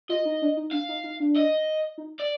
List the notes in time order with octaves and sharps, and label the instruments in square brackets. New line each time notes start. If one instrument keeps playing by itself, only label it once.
[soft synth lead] F4 [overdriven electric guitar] D#5
[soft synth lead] D#4
D4
D#4
[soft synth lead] D4 [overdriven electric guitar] F5
[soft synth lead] D#4
D#4
D4
[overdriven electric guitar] D#5
[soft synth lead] D#4
[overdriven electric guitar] D5